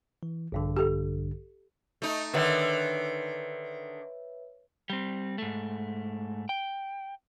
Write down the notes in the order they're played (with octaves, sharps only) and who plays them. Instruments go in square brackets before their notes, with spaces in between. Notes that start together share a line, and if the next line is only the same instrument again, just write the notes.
[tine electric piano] E3
A#1 G2 D3
[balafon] G4 A4
[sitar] A3 D#4
[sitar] D3 D#3 [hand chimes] B4 C#5 E5
[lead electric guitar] G3 C4
G#2 A3
G5